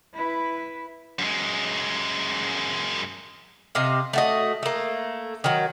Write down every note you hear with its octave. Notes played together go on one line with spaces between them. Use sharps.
E4 B4
F#2 G#3
C3 D#5 F5
A3 F#4 D#5
A3 A#3
D#3 F#3